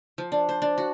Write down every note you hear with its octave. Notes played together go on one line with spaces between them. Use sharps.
F3
D4
C5
D4
F#4